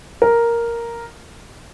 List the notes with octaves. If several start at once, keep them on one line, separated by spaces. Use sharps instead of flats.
A#4